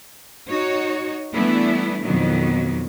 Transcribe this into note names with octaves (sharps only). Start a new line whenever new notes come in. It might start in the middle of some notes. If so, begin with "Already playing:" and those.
D#4 F#4 C#5
E3 G3 A3 B3 D4 E4
F2 B2 D#3 F#3 B3